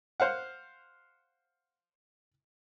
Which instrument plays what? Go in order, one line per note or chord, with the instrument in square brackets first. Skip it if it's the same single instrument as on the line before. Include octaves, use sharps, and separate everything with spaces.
[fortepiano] C5 F5 F#5